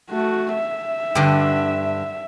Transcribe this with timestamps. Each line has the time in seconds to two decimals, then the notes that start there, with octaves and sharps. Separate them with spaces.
0.10 A3 F#4
0.54 E5
1.15 G2 D3